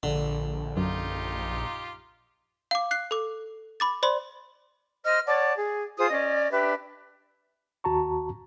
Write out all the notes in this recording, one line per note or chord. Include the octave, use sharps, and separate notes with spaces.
A#1 D3
F#2 D#4 F4 G4
F5 D6
F#6 C7
A4 D6
B5 D6 A6
C5 D5 B5 C6
C5 D#5 F6
C#5 D5 F#5 A5
G#4
F4 G#4 C5 D#6
C#4 D5 D#5
D4 G4 B4 E5
D#2 F#4 A5 A#5 C#6